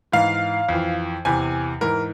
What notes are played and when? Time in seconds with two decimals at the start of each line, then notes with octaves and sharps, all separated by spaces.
0.12 G#2 E3 F5
0.69 F2 E3
1.25 E2 C3 E3 G#5
1.81 G#2 E3 A#4